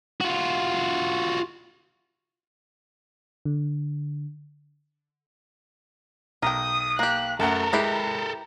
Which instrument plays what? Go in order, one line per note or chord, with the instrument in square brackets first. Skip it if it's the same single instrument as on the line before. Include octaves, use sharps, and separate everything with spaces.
[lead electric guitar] F4 F#4
[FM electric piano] D3
[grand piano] B1 [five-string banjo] A#4 G5 [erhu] D#6
[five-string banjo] A#3 G4 [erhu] F#6
[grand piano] F#2 A3 F#5 [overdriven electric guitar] A4 A#4 [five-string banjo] A5 [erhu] A#5
[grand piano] G#3 [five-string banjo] E4 G4 B4